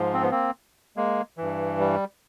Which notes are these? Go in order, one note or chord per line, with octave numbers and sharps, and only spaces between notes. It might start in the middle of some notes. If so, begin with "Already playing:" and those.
Already playing: G#2 F3
C4
B3
A#3 C4
G#3 A#3
G2 E3
G3